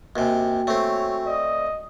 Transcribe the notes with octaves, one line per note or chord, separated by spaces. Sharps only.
D#2 C3 F#4 G5 G#5
A3 C4 C#5
D5 D#5